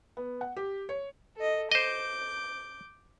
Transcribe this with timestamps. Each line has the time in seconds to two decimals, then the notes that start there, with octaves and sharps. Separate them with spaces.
0.17 B3
0.41 F#5
0.57 G4
0.89 C#5
1.36 A4 D#5
1.72 C5 D#5 D6 G6